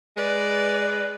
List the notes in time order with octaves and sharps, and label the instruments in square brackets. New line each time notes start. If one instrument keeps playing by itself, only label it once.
[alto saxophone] G#3 [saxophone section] B4 [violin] D5